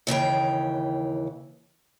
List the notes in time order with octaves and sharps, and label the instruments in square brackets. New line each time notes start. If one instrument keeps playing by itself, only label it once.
[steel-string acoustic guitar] D#2 C#3 E3 G5